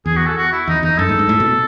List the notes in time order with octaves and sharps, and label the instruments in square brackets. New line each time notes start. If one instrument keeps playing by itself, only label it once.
[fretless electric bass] E2 [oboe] G#4
[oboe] F#4
A4
F#4
E4
[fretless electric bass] E2 [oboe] D#4
[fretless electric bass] E2 [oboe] D#4
[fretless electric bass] F#2 [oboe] A4
[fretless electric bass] G#2
G#2
A2
B2